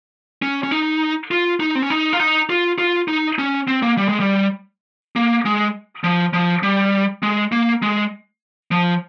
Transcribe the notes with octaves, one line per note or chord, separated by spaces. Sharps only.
C#4
C#4
D#4
F4
D#4
C4
C#4
D#4
F4
D#4
F4
F4
D#4
C#4
C4
A#3
G3
G#3
G3
A#3
G#3
F3
F3
G3
G#3
A#3
G#3
F3